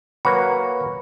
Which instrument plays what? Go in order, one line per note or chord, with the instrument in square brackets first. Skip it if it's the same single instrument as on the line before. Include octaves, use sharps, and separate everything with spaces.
[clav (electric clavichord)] F#3 A#3 F#4 [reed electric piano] B4 B5 [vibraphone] C#5